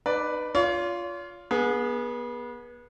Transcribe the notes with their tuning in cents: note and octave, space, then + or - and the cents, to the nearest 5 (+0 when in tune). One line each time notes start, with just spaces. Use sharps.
D#4 -30 B4 +0 D5 +0
F4 +0 C#5 +45
B3 -30 G#4 +0